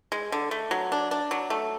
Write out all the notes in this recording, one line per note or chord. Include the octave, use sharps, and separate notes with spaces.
G#3
D3
A3
F#3
D4
D4
F#3
A3